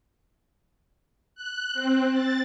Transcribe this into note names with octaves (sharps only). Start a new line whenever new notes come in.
F#6
C4
A6